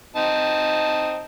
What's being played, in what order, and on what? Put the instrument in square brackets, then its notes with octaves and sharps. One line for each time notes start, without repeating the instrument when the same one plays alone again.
[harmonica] C4 D#4 A5